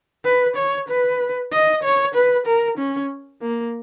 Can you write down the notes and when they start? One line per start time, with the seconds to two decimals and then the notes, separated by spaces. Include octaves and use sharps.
0.25 B4
0.56 C#5
0.89 B4
1.52 D#5
1.83 C#5
2.14 B4
2.46 A#4
2.78 C#4
3.42 A#3